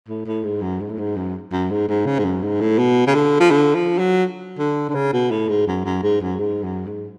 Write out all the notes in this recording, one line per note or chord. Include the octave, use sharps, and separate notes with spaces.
A2
A2
G#2
F#2
G#2
A2
G#2
F#2
F#2
G#2
G#2
C#3
G#2
F#2
G#2
A2
B2
C#3
D3
F3
D3
F3
F#3
D3
D3
C#3
B2
A2
G#2
F#2
F#2
G#2
F#2
G#2
F#2
G#2